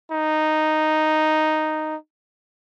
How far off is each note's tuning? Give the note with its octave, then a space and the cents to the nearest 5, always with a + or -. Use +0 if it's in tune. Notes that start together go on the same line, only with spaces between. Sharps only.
D#4 -5